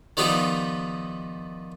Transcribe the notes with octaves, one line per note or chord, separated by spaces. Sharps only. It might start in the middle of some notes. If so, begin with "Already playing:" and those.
D#3 F3 G3 B3 D#4 F4